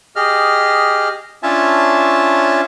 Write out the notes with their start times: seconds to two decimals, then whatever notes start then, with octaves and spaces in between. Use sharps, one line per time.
0.16 G4 G#4 D#5 F6
1.43 C#4 D4 F4 C#5 E5 A5